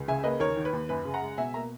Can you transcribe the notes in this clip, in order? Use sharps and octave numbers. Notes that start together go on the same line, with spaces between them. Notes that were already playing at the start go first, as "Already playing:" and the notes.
Already playing: C#2
C#3 E5 G#5
A#3 B4 D#5
D#2 A#4 C#5
D#3
B4
D#2
F#2 B4
C#3
F#5 A#5
G#3
B2 E5 G#5
A#3 A#5